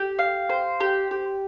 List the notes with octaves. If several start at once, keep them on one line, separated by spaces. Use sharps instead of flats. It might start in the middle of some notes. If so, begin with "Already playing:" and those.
Already playing: G4
F5
C5
G4
G4